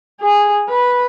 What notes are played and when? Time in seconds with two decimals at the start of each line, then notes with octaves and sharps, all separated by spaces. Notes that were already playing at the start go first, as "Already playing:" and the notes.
0.20 G#4
0.69 B4